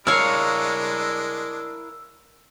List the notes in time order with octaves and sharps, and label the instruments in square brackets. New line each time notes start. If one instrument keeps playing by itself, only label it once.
[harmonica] G#3 D4 [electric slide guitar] E4 A#4 [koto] C#5 F5 [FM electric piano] E6